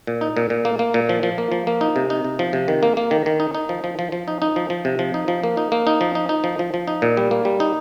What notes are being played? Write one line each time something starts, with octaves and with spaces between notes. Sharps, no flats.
A#2
D#4
A#2
A#2
A#3
A#3
A#2
F3
F3
A#3
F3
A#3
D#4
C3
D#4
C3
F3
C3
D#3
A#3
A#3
D#3
D#3
D#4
D#4
F3
F3
F3
F3
D#4
D#4
F3
F3
C3
F3
D#4
F3
A#3
D#4
A#3
D#4
F3
D#4
D#4
F3
F3
F3
D#4
A#2
G3
A#3
G3
D#4